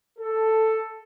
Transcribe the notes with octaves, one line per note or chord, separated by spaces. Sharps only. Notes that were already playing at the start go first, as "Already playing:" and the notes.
A4